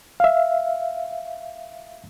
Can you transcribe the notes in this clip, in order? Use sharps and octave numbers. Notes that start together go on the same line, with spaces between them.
E5 F5